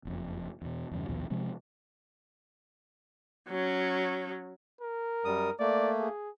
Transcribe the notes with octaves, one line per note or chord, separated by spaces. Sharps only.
F#1 F2
E2 B2
E2 G2 C#3
A#1 D#2 B2 F3
C3 F3 G#3 C4
F#3 C#4
A#4
F#2 G3 D#6
A3 A#3 D5
G#4